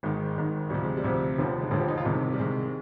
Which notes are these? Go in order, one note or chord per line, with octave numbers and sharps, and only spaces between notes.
G#1 G#2 D#3 G#3
G#1 G#2 D#3
D2 C3 F3 G3
G#3
G3
D2 C3 F3
F1 D#2 D3 F3 G3
G#3
F1 D#2 D3 F3 G#3
G4
D#4
F4
C2 C3 D#3 G#3
G3
C2 C3 D#3 G#3